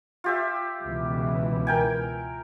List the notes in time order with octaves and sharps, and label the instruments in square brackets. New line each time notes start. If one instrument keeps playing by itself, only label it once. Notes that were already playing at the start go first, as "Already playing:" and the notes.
[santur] F4 G4 E5
[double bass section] C#2 B2 E3
[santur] A#4 G5 G#5